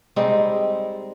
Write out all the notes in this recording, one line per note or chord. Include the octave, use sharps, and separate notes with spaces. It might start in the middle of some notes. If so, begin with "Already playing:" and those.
G3 G#3 C4 D#4